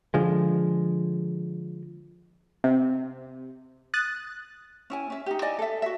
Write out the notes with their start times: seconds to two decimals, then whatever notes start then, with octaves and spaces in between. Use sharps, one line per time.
0.14 D3 F3 G#3
2.64 C3
3.94 D#6 F#6 A6
4.90 C#4 E4 G#5
5.10 C#4 E5
5.26 D#4 G4
5.42 E4 D5 D#5 G#5
5.59 A4 E5
5.82 F#4 E5